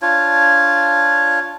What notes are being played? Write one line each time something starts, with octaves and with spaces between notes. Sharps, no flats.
D4 F4 C#5